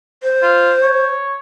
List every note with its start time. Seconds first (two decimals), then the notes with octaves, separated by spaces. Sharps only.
0.23 C5
0.43 F4
0.83 C#5